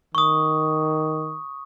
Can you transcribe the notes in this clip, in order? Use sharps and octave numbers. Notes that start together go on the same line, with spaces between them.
D#3 C#6 D#6